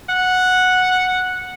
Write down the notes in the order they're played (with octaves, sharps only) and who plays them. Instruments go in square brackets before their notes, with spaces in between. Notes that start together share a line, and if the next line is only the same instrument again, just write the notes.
[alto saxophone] F#5